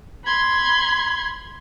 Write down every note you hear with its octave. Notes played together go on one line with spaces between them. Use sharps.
B5 C6 G#6